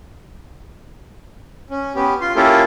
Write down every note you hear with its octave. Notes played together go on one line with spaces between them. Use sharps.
C#4
B3 C#4 G4
F4 C6
A#3 C#4 E4 F4 G4 A4